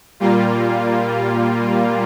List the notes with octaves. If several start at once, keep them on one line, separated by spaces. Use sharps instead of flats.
A#2 G3 A#3 F4